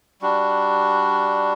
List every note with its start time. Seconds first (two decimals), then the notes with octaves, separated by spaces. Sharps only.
0.22 G3 D4 F#4